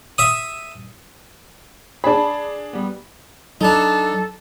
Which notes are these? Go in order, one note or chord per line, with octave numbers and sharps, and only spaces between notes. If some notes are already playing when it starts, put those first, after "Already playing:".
E5 D#6
D4 G#4 D5 A5 B5
G3 B3
F#3 D4 D#4 A4